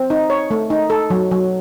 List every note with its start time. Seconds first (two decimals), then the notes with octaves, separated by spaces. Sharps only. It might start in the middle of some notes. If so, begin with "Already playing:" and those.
Already playing: C4
0.10 D#4
0.30 C#5
0.51 A3
0.70 D#4
0.90 A4
1.10 F#3
1.31 F#3